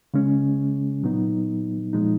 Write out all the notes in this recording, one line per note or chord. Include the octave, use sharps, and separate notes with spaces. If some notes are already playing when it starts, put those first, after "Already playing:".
C#3 G#3 C#4
A#2 F#3 B3 D#4
A#2 F3 G#3 D#4